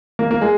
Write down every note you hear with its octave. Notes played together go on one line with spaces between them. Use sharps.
A#3
A#3
G#3